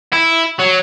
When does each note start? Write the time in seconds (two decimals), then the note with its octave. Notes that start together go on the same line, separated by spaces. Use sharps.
0.13 E4
0.60 F#3